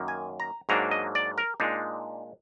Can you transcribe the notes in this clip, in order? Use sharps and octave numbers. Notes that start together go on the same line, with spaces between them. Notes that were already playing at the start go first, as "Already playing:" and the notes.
Already playing: F#2 D#3 A#3
G#5
A#5
G#2 F#3 A#3 D4 A#5
D#5
D5
A#4
A#2 G#3 D4 D#4